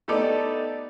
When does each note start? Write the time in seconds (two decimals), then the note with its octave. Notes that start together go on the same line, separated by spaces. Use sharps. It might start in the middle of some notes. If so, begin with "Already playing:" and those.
0.08 A3 B3 D#4 G4 A4 D5